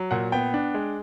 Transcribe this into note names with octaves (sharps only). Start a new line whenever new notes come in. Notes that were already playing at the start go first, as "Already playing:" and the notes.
Already playing: F#3
A#2 F#5
B3 G5
D4
G#3